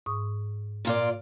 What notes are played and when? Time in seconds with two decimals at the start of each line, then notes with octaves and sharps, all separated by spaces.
0.06 G#2 C#6 D#6
0.85 A#2 F4 D5